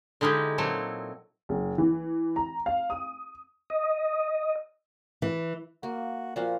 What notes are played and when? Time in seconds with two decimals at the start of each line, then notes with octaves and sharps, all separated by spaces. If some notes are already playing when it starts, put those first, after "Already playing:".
0.21 D3 G#3 D#4 E4 G4
0.58 A#2 F#3 C4 A4
1.49 F#1
1.78 E3
2.36 A#5
2.66 F5
2.90 D#6
3.70 D#5
5.22 E3
5.83 A#3 F#4
6.36 A#2 F3 F#4 F5